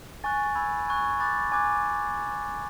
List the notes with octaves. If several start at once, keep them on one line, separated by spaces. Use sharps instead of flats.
G#5 C#6 F#6 A6
G#5 B5 E6 G#6
G#5 C#6 F#6 G#6
G#6
B5 D6 F#6 A6
G#5 D6 F#6 G#6